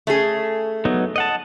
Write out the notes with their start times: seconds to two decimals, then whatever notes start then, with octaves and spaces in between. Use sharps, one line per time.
0.07 A3 C#4 G#4
0.85 F#3 B3 D#4
1.16 D#5 F#5 A5